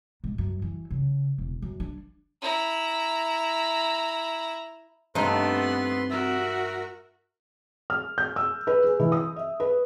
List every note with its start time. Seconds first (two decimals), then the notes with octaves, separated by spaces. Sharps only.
0.24 G#2
0.38 F#2
0.62 E3
0.91 C#3
1.38 E1
1.62 F#2
1.80 D4
2.41 E4 A#5
5.15 G2 C3 A3 B3 C4 D#4 B4 C6
6.10 F#4 A#4 E5
7.90 F6
8.18 G6
8.36 E6
8.67 B4
8.84 G#4
9.00 E3
9.12 D#6
9.36 E5
9.60 B4